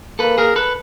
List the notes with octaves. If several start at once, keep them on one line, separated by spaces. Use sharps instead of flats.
A#3 A4 B4
G#4 A#4
A4 B4